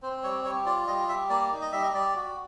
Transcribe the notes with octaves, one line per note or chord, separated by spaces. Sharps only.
C4 C5
G3 C#5
G3 C#5
F4 D5
G3 D#5
G3 E5
A#3 D5
D#4
D#5
G3 E5
D#5
G3 D5
F#4